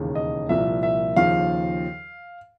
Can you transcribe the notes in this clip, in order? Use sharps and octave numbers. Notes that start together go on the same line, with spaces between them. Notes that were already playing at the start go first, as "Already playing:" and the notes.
Already playing: E1 D#2 C#3
D#5
C2 A#2 F3 A#3 E5
E5
D#2 C#3 F3 F5